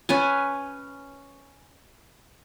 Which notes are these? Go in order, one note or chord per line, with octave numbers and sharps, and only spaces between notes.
C#4 B4 G#5